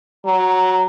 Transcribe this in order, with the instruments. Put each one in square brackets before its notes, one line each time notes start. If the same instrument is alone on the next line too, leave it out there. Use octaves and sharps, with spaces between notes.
[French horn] F#3 [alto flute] A#5